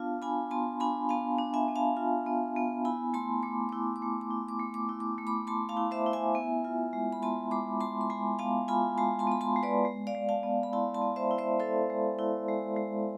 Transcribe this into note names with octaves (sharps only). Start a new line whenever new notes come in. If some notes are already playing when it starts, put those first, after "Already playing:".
Already playing: B3 D4 F4 F5 A5
D4 G#5 B5
B3 A5 C6
D4 G#5 B5
B3 F5 A5
D4
E5 G#5
B3
F5 A5
F4
B3
B3
E4 G#5 B5
A3 A5 C6
A3 D6
E4 D6
D6
A3
D6
E4
D6
A3
D6
E4
D6
A3
B5 D6
A3 A5 C6
F5 A5
E4
C5 E5
E4
E5 G#5
B3
F4
G#3
B5
B3 A5 C6
G#3 B5 D6
G#3 A5 C6
C6
G#3 G#5 B5
B3 F5 A5
F4 G#5 B5
G#3 A5 C6
A5 C6
B3 B5
A5 C6
G#3
B4 D5
G#3
D5 F5
G#3
F5 A5
B3
B5
E4 A5 C6
A5 C6
B3
C5 E5
E4
C5 E5
E4 A4 C5
G#3
E4
G#3
G#3